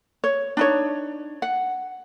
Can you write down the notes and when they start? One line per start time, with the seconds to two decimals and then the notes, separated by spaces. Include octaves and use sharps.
0.24 C#5
0.57 D4 D#4 C#5
1.42 F#5